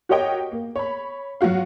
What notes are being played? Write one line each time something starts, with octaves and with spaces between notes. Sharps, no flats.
F#4 G4 A#4 C#5 D#5 G5
A#3
C#5 B5
F#3 F4 F#4 F5